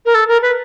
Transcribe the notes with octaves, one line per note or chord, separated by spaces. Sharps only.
A#4
A4
A#4
B4